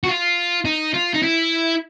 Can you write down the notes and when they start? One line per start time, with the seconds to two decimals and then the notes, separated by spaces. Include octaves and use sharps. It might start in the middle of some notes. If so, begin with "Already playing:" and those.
0.03 F#4
0.07 F4
0.65 D#4
0.94 F4
1.14 D#4
1.23 E4